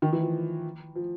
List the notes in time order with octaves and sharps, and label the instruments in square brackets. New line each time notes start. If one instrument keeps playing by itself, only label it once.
[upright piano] D#3
E3
F3
F3